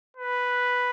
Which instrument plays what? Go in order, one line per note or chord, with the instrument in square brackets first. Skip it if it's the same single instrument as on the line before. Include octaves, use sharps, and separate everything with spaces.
[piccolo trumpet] B4